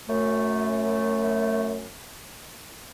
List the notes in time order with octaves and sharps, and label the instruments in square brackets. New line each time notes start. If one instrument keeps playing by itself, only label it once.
[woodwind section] F#2 A3